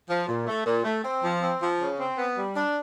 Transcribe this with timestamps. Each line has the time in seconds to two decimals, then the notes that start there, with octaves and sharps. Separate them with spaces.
0.10 F3
0.28 A#2
0.47 A3
0.66 A#2
0.85 A3
1.04 C4
1.23 F3
1.42 C4
1.62 F3
1.80 C#3
1.99 C4
2.17 B3
2.37 G3
2.56 D4